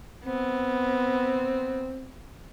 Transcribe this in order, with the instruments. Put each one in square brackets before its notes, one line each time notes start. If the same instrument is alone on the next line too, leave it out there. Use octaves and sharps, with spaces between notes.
[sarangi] B3 [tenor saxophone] C4